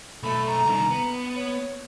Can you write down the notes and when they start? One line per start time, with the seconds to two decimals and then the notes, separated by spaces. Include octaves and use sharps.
0.23 B1 A3 B5
0.47 A#5
0.66 C2 D#3
0.91 B3
1.36 C#5